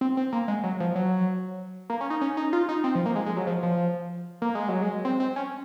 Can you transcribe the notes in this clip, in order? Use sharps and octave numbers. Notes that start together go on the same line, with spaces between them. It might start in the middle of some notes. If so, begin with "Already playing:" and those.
C4
C4
A#3
G#3
F#3
F3
F#3
A#3
C#4
D#4
C#4
D#4
F4
D#4
C4
F3
A#3
G#3
G#3
F#3
F3
F3
A#3
G#3
F#3
G#3
C4
C4
C#4